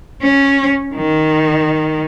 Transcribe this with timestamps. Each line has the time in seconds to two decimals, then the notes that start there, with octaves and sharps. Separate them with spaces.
0.23 C#4
0.95 D#3